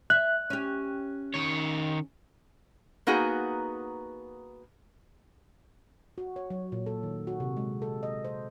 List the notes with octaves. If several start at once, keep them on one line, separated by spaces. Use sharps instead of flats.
E5 F#6
C#4 G4
D#3 C#5
A#3 B3 D#4 F#4 G#4
F#4
C#5
F#3
A#2
A4
D#3
F#4
C3
G#3
A4
D#5
C5